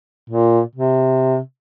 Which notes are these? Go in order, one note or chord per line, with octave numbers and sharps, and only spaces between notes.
A#2
C3